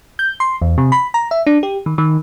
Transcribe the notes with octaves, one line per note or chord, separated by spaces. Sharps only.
G6
C6
E2
C3
B5
A#5
E5
D4
G4
D#3
D#3